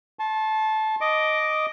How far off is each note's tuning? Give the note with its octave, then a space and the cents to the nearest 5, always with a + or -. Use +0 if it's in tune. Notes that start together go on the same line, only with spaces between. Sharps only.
A5 -15 C6 +35
D#5 +0 D6 +0